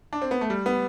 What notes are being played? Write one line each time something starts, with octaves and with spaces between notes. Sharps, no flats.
D4
C4
B3
A3
G3
B3